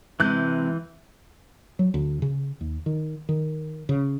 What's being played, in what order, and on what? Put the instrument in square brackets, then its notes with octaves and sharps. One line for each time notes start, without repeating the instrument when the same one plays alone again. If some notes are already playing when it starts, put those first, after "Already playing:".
[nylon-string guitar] C3 G#3 [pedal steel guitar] E3 F#6 G6
[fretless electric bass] F#3
D2
C#3
D#2
D#3
D#3
C#3